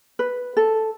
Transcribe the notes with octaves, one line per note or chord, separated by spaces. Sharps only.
B4
A4